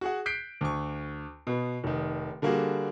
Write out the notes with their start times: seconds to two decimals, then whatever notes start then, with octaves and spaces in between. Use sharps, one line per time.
0.01 F#4 G#4 F#5
0.26 F#6 G6 B6 C7 D7
0.61 D2 C#6
1.47 B2 B3
1.84 F1 D#3
2.42 D3 G3 A#3 F#4 G#4